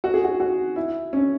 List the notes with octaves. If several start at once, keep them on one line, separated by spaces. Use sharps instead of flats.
F#4
G#4
F#4
F#4
E4
C#4